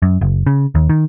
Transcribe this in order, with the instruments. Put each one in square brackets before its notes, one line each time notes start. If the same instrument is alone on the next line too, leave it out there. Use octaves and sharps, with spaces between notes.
[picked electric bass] F#2
F#1
C#3
D#2
D#3